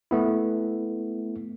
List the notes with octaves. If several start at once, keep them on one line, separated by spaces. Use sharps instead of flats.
A3 B3 E4